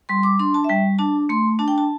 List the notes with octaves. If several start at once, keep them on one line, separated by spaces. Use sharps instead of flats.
G3 C6
D6
D4 C6
A5
E5
G3 G5
D4 A5
A3 C6
D4 A5
G5
A5